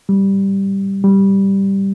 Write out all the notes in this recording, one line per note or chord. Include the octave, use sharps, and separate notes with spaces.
G3
G3